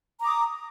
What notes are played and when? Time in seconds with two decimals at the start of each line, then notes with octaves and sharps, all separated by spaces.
0.20 A#5
0.23 D6
0.26 D#6